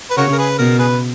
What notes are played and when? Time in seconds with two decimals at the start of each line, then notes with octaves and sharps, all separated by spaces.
0.11 B4
0.17 C#3 F#4 A#4 C#5
0.32 A#4
0.38 G#4 B4
0.58 B2 A#4
0.79 G#4 B4